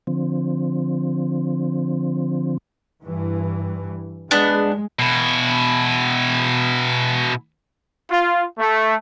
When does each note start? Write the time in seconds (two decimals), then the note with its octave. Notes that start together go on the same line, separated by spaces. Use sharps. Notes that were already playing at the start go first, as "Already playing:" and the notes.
0.07 D3 F3 C4
3.02 G2 E3
4.31 G#3 B3 D4
4.99 B2 E4
8.11 F4
8.58 A3